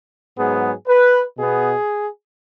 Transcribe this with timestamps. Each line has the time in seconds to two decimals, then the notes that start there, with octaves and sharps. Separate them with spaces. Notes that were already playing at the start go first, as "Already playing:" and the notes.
0.37 G#2 F#3 B3 G#4
0.88 B4
1.37 B2 B3 G#4